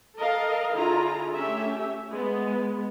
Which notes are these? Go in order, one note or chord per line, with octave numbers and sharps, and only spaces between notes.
A4 A#4 D#5 F5
D3 E4 F4 G#4 A#5
A3 C#4 G4 E5
G#3 B3